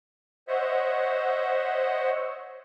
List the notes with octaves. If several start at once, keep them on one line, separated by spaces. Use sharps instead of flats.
C5 C#5 D#5 E5 F#5